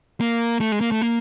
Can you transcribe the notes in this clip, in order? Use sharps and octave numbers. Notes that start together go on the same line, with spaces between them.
A#3
A3
G#3
A#3
A3
A#3